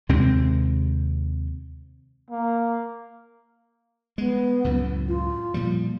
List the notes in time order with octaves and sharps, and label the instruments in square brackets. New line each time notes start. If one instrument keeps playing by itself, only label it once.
[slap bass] D#2 C3 G#3 C4
[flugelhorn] A#3
[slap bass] G#3 [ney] B3
[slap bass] C#2 F#2 A2
[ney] F4
[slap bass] A#2 F3 G3